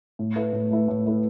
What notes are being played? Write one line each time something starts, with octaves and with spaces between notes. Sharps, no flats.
A2
A3 E4 B4
A2
A3 E4 B4
A2
A3 E4 B4